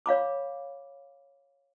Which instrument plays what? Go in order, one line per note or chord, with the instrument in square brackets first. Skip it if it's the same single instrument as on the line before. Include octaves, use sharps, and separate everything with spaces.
[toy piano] C#5 F5 B5 D6